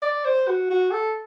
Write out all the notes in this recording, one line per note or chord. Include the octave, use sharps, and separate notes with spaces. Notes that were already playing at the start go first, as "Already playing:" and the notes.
D5
C5
F#4
F#4
A4